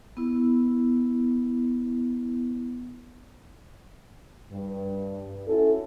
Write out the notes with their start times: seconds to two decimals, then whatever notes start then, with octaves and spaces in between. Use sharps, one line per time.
0.17 B3 E4
4.50 G2
5.48 C#4 E4 F#4 A4